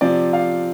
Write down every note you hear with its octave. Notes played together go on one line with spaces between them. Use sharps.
C3 F3 D5
F5